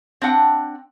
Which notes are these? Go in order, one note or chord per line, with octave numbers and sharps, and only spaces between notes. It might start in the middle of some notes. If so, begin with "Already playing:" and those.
C4 D4 F#5 G5